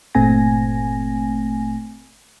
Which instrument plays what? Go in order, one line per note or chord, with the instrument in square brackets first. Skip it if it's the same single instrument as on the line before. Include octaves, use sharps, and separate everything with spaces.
[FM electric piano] G1 A#2 A3 C4 G#5 A#6